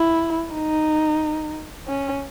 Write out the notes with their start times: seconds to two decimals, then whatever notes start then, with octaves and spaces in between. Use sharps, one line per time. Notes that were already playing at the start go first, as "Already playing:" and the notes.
Already playing: E4
0.54 D#4
1.88 C#4